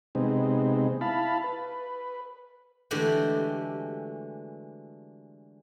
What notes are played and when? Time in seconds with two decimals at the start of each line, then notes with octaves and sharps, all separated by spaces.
0.15 C3 G#3 B3 C4 D#4
1.01 E4 F5 A5 B5
1.44 B4
2.91 D3 E3 G#3 A3 F#4 G4